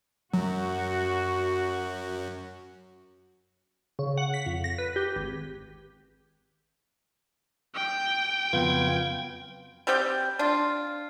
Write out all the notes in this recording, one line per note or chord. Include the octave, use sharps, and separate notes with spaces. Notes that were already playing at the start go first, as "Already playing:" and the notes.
F#2 F#3 F#4
C#3
F#5
B6
F2
A#6
B4
G4
G#1
G5
F2 C#3 F#3 B3 F4 G#6
G3 C4 G4 G5
D4 F4